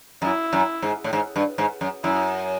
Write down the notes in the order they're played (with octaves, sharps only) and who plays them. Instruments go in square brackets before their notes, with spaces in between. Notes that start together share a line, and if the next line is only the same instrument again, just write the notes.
[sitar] F#2 [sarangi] E4
[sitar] F#2
G#2
A2
G#2
G2
G#2
F#2
[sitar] F#2 [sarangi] E4